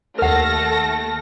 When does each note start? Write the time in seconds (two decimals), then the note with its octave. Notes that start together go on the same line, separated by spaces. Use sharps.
0.19 D#2 A3 A4 A#4 F#5 F6 A#6